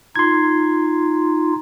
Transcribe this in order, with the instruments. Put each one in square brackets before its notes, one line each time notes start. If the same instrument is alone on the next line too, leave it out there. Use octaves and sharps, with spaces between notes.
[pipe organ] D#4 F4 [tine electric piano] C6 G#6